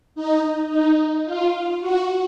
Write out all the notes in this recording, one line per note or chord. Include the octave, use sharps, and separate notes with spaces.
D#4
D#4
F4
F#4